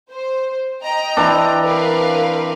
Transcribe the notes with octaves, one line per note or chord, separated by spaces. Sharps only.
C5
D#5 G5 A#5
E3 C4 D4
A#4 B4 F5